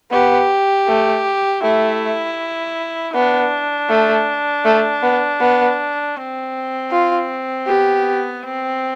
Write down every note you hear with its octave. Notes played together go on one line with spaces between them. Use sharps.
B3 G4
A3
A3 E4
B3 D4
A3
A3
B3
B3
C4
F4
B3 G4
C4